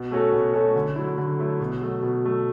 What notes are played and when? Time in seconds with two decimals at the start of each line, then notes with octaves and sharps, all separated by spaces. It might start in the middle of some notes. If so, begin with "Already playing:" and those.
Already playing: B2
0.11 A3 C#4 F#4 A4
0.32 B2
0.54 A3 C#4 F#4 A4
0.76 D3
0.96 F#3 A3 E4
1.18 D3
1.39 F#3 A3 E4
1.60 B2
1.82 F#3 A3
2.03 B2
2.24 F#3 A3